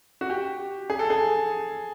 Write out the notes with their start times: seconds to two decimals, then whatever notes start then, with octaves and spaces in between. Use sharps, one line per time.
0.21 F#4
0.30 G4
0.90 G#4
0.99 A4
1.10 G#4